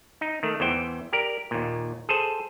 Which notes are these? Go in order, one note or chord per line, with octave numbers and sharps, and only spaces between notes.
D#4
D#3 A3
E2 E3 C5 G5
G4 A#4 D5
D#2 A#2
G#4 A4 C5